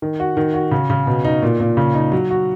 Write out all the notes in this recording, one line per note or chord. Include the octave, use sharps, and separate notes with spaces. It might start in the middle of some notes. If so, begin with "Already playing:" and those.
D#3
F#4
D#3
F#4
C#3
C#3
B2
D#4
A#2
A#2
C#3
D#4
F#3
F#4